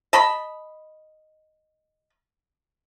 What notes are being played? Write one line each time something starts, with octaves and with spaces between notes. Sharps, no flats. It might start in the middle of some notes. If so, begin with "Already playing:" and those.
D#5 A5 B5